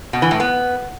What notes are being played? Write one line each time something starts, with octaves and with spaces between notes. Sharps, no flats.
B2
E3
A2
B3